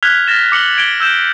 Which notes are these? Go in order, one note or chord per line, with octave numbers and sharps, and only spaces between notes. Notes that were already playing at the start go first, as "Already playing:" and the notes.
F6 F#6 G#6 B6 F7 G7
F6 A6 A#6 E7
D6 C#7 F#7 G7
G#6 D7 G7
E6 G6 E7